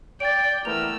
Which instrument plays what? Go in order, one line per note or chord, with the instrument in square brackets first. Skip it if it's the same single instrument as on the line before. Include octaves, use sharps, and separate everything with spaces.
[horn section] D5 [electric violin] G5 [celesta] A6 D7
[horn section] E3 B3 A#4 [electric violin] A3 E6 [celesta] F7